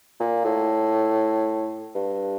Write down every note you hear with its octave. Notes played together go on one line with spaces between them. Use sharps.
A#2
A2
G2